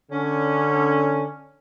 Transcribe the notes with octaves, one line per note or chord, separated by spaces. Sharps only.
D3 C#4